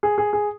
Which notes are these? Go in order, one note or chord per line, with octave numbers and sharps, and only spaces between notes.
G#4
G#4
G#4